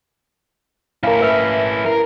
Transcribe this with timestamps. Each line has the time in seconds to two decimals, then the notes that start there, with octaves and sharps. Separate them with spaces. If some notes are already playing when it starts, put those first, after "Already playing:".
1.03 C#4 E4 A#4 F5
1.21 B4 E5 F6
1.86 A#4